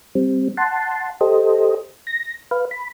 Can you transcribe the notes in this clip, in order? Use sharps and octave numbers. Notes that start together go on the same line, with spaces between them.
G3 C4
F#5 A5 C6
G4 A4 C5 D#5
A#6
B4 F5
B5